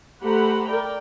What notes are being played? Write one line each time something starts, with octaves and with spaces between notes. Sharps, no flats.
A3 G4 C5 F#5 A#5 B5
A#4 D5 G5